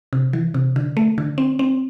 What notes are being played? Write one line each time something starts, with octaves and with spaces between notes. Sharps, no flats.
C3
E3
C3
D3
A3
D3
C4
C4